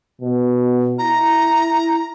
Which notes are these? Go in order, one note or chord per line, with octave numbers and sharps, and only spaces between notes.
B2
E4 A#5